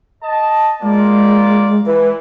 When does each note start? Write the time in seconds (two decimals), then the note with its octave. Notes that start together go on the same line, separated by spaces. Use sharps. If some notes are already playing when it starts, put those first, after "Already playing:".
0.23 D#5 A5
0.83 G#3 A#3 F4 D5
1.86 E3 B4